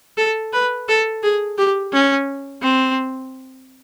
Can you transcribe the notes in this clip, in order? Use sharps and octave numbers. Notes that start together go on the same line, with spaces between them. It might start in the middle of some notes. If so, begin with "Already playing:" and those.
A4
B4
A4
G#4
G4
C#4
C4